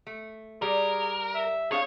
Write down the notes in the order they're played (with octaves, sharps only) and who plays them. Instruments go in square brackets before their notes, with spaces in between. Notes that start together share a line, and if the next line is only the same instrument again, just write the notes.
[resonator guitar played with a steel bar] A3
[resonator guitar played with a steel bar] G3 [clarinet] G#4 [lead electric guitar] A#4
[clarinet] E5
[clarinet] D4 [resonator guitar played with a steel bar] G#4 C5 F5 [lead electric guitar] C#5